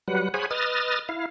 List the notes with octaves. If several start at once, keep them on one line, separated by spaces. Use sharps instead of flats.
F#3 G3 B4 F#5
G#4 C5 C#5 F#5 G#5 B5
B4 D#5 D#6 F6 A6
E4 F5